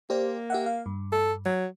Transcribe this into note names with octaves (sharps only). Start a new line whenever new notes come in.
A#3 G4 C5 D5
G4 E5 F#5
F5
G2
A4
F#3